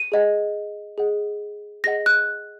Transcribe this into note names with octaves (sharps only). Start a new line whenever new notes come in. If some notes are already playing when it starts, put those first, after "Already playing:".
Already playing: D#7
G#4 D#5 F#5
G#4 D#5 F#5
G#4 D#5 F#5 A#6
F#6